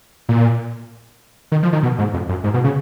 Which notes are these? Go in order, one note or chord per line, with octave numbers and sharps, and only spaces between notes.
A#2
D#3
F3
D#3
B2
G#2
F2
F#2
G#2
B2
C#3